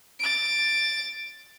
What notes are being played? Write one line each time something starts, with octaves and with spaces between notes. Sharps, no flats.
A6 D7